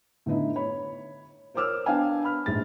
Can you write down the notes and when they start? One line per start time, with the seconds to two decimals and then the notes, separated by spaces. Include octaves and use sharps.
0.26 A2 D3 B3 D#4 E4
0.56 C#5 B5
1.54 A#4 C5 C#5 D6 E6 F6
1.86 B3 D4 F5 G5 G#5
2.24 B5 F6
2.46 A#1 G#2 A3 A6